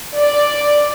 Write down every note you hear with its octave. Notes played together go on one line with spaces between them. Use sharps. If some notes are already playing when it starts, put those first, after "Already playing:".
D5